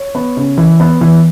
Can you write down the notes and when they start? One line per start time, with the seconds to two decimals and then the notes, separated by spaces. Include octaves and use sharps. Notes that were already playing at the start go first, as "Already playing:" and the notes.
Already playing: C#5
0.15 B3
0.37 C#3
0.58 E3
0.80 B3
1.01 E3